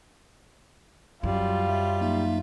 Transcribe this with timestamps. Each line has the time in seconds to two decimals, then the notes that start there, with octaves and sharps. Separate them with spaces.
1.23 F#2 G3 F4
1.69 F#3 E5
2.01 A#3 D#4 E5